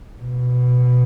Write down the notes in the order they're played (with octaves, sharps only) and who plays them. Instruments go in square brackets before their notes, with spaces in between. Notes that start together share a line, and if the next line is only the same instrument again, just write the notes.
[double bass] B2